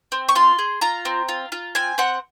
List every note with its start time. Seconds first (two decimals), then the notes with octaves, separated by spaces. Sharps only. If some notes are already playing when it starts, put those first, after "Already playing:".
0.12 C4
0.29 C#6
0.35 F4 C6
0.59 G#4
0.81 F4 A#5
1.05 C4
1.29 F4
1.52 F4
1.75 C4 G#5
1.98 C4 F#5